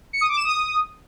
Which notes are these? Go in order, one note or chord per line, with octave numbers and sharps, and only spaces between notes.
C#7
D#6
D6
E7
D#6